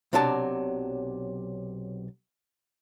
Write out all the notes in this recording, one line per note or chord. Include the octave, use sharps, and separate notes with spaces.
B1 C3 F#3 D4 A5